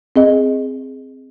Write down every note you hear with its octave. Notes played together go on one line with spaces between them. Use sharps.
C4 G#4 D#5